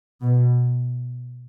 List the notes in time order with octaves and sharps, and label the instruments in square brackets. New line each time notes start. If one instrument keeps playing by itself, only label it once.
[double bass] B2